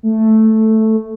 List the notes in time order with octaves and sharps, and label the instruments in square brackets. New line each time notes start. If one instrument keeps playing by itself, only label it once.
[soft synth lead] A3